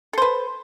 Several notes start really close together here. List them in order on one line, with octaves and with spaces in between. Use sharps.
A4 C5 B4